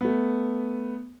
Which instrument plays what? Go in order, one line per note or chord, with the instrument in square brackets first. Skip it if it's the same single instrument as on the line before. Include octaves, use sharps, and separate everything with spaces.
[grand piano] A3 B3